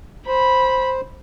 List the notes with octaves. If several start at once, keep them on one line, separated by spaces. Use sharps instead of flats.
C5 B5